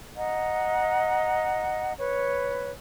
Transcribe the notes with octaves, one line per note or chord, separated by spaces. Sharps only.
D#5 F#5 A#5
B4 C#5